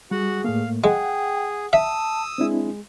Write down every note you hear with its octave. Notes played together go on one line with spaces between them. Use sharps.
G3 F#4 G#4 F#5
A2 A3 A#3 F5
G#3 G#4 F#5 G5
E5 A5 D#6 E6
G#3 C4 D4 E4